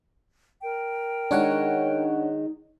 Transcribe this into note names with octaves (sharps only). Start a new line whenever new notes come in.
A#4 G5
D#3 G#3 D4 D#4 C#5 F#5